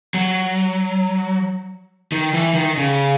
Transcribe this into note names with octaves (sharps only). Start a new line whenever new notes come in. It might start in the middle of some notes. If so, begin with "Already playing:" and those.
F#3
D#3
E3
D#3
C#3